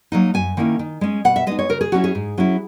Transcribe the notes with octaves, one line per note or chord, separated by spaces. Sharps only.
F#3 A#3 D#4
F#2 G#5
D#3 A#3 C#4 E4
D#3
G#3 C#4
B2 F#5
E5
G#3 B3 D#4 D#5
C#5
C#3 A#4
G#4
F#3 C#4 E4 F#4
G#4
G#2
F#3 C#4 E4